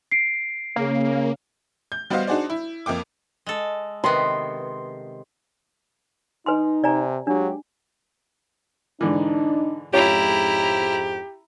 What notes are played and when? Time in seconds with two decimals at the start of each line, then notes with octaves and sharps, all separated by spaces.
0.11 C7 D7
0.76 C#3 A#3
1.92 G6
2.10 G3 B3 F#4 C5 D#5 F5
2.27 D4 D#4 F#4 G#4 C5 D5
2.50 E4
2.86 F2 A#3 G5 D6
3.46 G#3 A4
4.04 C3 D#3 B3 C6
6.46 D#4 B4 G#5 C6
6.84 C3 D5 G#5 A#5
7.27 F#3 G#3 D4 F4 G4
9.01 G#2 D3 E3 D4 D#4
9.93 F2 G#2 C#4 E4 F4 G4 C#5 A#5